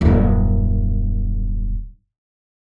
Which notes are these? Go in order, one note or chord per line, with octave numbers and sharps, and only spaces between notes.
D#1 F#2